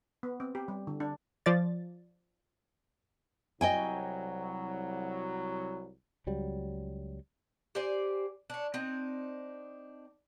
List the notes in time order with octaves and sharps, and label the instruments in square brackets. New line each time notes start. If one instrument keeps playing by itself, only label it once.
[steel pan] B3
C4
G4
G3
D3
D4
[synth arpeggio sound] F3 D5 A6
[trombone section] C2 F#3 [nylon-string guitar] D#5 G5 G#5
[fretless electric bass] C#2 F#3 G3
[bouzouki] G4 C5 D5 G#5
D4 C#5
C4 D4 D#4